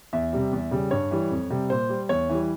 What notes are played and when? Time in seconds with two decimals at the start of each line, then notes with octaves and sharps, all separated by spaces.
0.13 E2 E5
0.33 C3 G3
0.52 E2
0.71 C#3 G3
0.91 G2 C#5
1.11 E3 G3
1.31 F2
1.50 C3 G3
1.70 A#2 C5
1.89 G3
2.09 E2 C#5
2.29 E3 G3